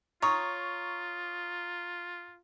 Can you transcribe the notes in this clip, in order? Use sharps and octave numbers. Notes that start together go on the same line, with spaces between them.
F4 C#5 A#5 C#6 D#6